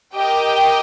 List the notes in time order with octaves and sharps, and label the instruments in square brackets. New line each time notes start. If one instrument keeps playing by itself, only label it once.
[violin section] G4 A#4 D#5 G5